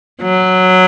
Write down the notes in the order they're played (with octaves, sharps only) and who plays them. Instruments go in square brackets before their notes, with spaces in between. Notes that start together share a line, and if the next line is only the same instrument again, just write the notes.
[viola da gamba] F#3